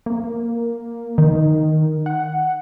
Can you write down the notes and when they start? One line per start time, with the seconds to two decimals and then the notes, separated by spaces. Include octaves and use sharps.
0.06 A#3
1.18 D#3
2.06 F#5